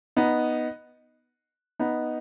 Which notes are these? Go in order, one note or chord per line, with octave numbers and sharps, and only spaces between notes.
B3 D#4
B3 D#4